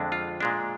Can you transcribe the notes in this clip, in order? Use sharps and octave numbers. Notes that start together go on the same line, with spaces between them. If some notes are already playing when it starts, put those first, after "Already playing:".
Already playing: F2 D3 G#3 D4
F4
A#2 G#3 D4